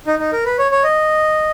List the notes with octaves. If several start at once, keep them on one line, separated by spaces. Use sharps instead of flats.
D#4
D#4
A#4
B4
C#5
C#5
D#5